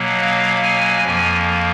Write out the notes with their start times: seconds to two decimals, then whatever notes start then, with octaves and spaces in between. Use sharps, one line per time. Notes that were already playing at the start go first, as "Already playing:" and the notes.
Already playing: B2 F#3 A#3
0.22 F5
0.63 G#5
1.04 F2 F3 A#3